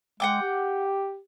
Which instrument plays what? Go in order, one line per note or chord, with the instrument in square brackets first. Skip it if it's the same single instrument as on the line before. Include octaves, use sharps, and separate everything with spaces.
[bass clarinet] G#3 [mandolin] F#5 G5 D6
[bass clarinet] G4